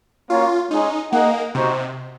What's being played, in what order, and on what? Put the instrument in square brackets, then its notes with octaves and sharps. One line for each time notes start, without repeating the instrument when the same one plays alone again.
[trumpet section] A#3 C#4 F#4 C#5 [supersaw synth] F4
[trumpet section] G#3 C#4 G#4 [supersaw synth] D#4
[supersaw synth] A#3 [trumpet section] D#4 G#4 D#5 F#5
[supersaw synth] C3 [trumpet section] D#4 F#4 C5